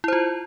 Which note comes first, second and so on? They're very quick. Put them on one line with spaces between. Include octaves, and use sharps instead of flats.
E4 C5 F4